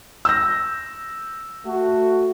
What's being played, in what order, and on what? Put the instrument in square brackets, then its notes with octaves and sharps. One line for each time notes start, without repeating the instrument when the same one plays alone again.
[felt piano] E6 G6 A#6
[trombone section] A3 F#4